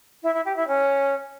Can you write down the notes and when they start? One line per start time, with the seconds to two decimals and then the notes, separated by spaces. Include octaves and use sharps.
0.23 E4
0.34 E4
0.45 G4
0.57 E4
0.68 C#4